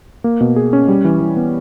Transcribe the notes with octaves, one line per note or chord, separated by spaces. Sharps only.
A#3
B2
G#4
C#4
G3
E3
E3
B3